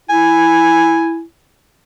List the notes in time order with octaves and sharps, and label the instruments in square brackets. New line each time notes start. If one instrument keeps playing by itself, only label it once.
[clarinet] E4 [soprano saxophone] G#5